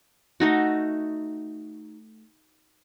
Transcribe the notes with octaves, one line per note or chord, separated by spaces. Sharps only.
A3 D#4 F#4